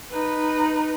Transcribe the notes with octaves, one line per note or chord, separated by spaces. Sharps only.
D#4 B4